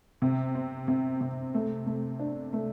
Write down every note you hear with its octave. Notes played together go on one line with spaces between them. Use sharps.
C3
C4
C3
C3
A3
A3
D4
A3